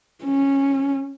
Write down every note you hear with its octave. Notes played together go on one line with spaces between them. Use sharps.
C#4